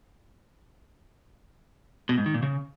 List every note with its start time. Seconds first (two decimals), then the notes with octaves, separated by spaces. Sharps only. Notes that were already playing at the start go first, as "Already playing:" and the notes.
2.09 B2
2.18 G#2
2.26 D#3
2.34 A#2
2.43 C#3